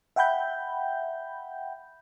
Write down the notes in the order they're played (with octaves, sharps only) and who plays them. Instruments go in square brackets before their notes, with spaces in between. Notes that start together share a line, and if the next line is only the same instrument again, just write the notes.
[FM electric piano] E5 F#5 G5 B5 G6